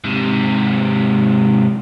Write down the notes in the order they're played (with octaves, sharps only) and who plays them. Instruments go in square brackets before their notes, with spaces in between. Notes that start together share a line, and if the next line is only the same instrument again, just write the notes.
[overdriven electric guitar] G#2 C3